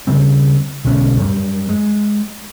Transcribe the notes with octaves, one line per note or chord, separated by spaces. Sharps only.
C#3 G3 C4
B1 D3 G#3 C#4
F#2 G3
G#3